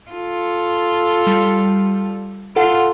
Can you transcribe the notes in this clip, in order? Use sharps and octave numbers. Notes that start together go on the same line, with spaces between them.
F4 A4
G3
F4 A4 F#5